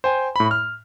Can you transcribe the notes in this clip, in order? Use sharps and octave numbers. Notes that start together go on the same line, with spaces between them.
C5 G5 G#5
A2 B5
F6